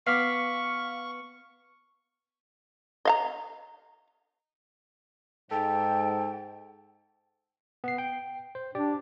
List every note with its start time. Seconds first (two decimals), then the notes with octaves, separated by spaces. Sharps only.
0.07 B3 F5 C#6 D6 F6 B6 C7
3.05 D#5 F5 A#5
5.51 G#2 A4 G5
7.84 B3 C7
7.98 G5
8.55 C5
8.75 D4 G4 D5